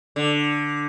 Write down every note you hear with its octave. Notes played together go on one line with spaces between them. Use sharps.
D3